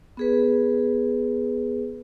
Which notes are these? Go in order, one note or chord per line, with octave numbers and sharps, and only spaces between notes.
B3 G#4 B4